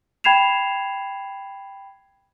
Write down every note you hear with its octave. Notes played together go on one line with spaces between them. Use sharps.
G5 B5 G#6 C7 E7 F7